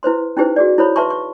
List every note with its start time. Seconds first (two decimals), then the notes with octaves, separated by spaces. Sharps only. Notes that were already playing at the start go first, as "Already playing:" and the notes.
0.03 E4 B4 C5 C6
0.37 C#4 D#4 E4 G4 B4 C5
0.56 F#4 G#4 D5
0.78 E4 A4 C5 C#5 B5
0.96 B4 E5 A5 C6 C#6
1.10 C#6